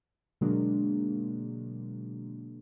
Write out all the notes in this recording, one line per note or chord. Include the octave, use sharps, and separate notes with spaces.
B2 D3 F#3 G#3 A#3 D4